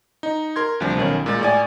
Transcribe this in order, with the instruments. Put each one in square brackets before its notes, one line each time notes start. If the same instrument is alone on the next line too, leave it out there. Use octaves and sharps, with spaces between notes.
[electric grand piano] D#4
A#4 C6 G#6
D2 C3 F3 G3
B1 D#3 C#4
A#2 G#3 A6
A2 D5 G#5